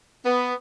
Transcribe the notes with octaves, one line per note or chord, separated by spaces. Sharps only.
B3